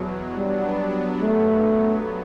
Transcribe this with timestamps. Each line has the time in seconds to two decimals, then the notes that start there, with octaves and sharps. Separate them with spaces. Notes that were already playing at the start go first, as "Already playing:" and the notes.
Already playing: E2 B2 F#3
0.36 F#3 G3 B3 D4
1.21 G2 F#3 A3 B3